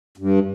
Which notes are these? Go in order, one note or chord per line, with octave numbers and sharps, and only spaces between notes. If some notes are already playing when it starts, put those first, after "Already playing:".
G2